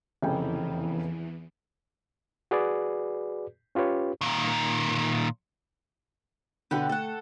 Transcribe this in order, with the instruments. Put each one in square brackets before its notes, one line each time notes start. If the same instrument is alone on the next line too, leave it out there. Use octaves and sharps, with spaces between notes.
[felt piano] F1 C#3 G5 [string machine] E2 E3
[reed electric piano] F#4 G#4 B4 D5
C#4 F4 G4 B4 C#5
[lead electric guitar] A#2 D#3
[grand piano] B2 D3 [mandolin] G4 B4 F#5
[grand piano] A3 [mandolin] A4 F#5